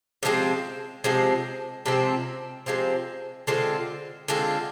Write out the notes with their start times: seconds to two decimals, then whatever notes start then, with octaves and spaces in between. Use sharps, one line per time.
0.23 C3 F3 G#3 C4
1.04 C3 F3 G#3 C4
1.86 C3 F3 G#3 C4
2.66 C3 F3 G#3 C4
3.47 D3 G#3 C4 F4
4.28 D3 G#3 C4 F4